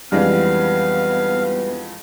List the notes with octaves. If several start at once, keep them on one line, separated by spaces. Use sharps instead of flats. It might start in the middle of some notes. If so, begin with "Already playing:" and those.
F2 E3 G3 G#3 B3 D4 G4 F5